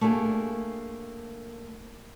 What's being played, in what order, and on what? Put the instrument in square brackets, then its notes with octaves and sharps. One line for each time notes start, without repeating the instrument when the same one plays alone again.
[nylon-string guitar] A3 A#3 D4 G4 G#4